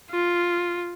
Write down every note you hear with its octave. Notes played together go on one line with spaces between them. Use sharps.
F4